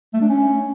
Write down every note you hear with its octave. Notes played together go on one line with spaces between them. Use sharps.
A3
D4
C#4